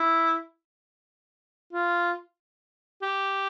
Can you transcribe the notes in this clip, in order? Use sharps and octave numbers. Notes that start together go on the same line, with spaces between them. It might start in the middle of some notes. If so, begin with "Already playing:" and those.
Already playing: E4
F4
G4